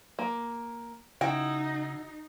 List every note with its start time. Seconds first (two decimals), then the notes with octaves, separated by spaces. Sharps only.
0.19 A#3
1.21 C#3 D#4 E4 F#4 G5